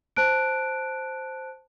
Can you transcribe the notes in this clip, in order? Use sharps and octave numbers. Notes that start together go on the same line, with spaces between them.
C5 A5 F#6 D7